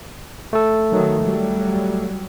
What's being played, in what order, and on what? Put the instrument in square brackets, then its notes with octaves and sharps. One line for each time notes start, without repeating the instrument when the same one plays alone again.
[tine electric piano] A3 A4
[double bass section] D#3 F#3
F#3 G3